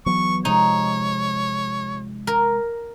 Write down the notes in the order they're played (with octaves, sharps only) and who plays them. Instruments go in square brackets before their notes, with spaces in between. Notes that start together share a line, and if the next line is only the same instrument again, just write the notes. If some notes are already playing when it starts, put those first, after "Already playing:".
[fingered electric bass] E3 F#3 B3 [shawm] C#6
[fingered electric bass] C3 F3 G#3 [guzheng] D#4 [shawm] C#5
[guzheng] A#4